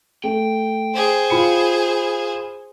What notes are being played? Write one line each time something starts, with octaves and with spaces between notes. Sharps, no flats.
A3 G5
G#4 C5
F4 B5 C#7